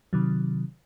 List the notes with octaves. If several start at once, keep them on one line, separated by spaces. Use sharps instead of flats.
C3 D#3 F#3